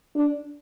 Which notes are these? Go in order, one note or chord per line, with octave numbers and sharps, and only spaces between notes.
D4